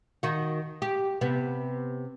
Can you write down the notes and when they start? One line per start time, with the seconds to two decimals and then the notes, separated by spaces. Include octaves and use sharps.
0.23 D#3 F#4
0.82 G4
1.21 C3 B3